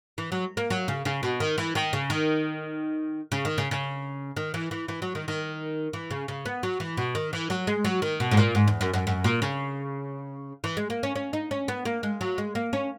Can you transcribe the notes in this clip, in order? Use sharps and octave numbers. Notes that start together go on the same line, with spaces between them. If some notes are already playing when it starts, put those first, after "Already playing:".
E3
F#3
A#3
F#3
C#3
C#3
B2
D#3
E3
D#3
C#3
D#3
C#3
D#3
C#3
C#3
D#3
E3
E3
E3
F#3
D#3
D#3
E3
C#3
C#3
B3
F#3
E3
B2
D#3
E3
F#3
G#3
F#3
D#3
B2
G#2
A#2
G#2
E2
F#2
F#2
F#2
A#2
C#3
E3
G#3
A#3
C#4
C#4
D#4
C#4
B3
A#3
G#3
F#3
G#3
A#3
C#4